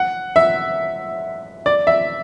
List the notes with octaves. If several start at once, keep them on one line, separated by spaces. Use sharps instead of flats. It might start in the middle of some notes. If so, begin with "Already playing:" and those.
Already playing: F#5
E5
D5
E5